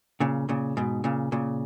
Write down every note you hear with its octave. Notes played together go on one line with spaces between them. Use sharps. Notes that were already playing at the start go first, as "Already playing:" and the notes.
A#2 C#3
A#2 C#3
G#2 B2
A#2 C#3
A#2 C#3